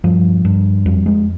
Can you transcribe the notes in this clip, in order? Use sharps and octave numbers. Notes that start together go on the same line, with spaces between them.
G2 F3
G2
F2 G3
G#3